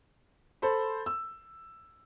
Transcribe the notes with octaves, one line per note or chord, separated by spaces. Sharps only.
A4 C5 B5
E6